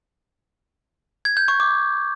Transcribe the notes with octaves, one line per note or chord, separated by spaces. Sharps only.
G#6
G6
C#6
D6